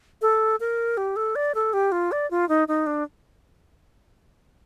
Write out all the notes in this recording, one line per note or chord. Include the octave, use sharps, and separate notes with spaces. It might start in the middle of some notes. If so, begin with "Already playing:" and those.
A4
A#4
G4
A4
D5
A4
G4
F4
D5
F4
D#4
D#4
D4